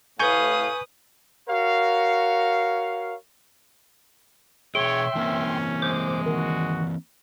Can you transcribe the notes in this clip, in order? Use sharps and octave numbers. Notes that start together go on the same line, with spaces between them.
A2 C3 B4 F5 G#5 C#6 D#6 G6
F#4 A#4 C#5 F5
B2 F3 G#4 C#5 E5 G5 C6
E3 A#3 C4 C#4
G#3 C5 D6
D#3 F#4